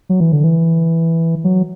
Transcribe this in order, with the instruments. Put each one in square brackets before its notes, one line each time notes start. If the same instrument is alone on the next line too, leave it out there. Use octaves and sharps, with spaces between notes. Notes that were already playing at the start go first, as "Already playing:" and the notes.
[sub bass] F#3
E3
D3
E3
F#3